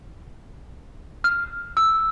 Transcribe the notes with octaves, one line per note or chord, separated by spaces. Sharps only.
F6
E6